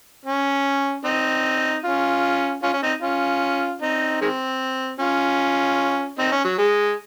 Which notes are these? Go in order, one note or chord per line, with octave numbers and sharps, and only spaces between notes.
C#4
C4 D#4
C#4 F4
C#4 F4
C#4
C4 D#4
C#4 F4
C4 D#4
D#3 G#3 C4
C#4 F4
C4 D#4
C#4
F#3
G#3